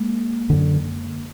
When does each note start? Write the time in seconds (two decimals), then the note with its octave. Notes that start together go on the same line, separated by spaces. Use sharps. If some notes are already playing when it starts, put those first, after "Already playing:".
Already playing: G#3 A#3
0.50 F#2 D3